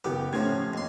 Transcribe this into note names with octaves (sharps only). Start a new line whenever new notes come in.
F#1 B3 G4 D6
A2 C3 F3 C#4 G#6
D#2 C6